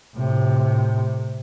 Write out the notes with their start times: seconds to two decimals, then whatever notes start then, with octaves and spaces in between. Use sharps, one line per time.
0.15 A2 C3